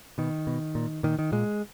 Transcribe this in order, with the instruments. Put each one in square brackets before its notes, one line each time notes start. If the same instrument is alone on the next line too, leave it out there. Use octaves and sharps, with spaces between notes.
[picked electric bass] B2 D#3
B2
A#2
A#2 D#3
D#3
A#2 G#3